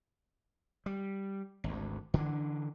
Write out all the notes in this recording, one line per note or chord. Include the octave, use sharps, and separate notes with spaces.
G3
G#1 D2
D3 E3 D4